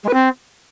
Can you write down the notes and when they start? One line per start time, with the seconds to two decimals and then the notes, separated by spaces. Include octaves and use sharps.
0.03 G#3
0.08 B4
0.13 C4